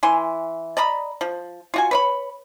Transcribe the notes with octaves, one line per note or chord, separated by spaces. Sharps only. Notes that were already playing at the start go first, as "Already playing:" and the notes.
E3 G#5 C6
D5 D#5 A#5 B5
F3
F4 F#4 G#5
B4 C#5 B5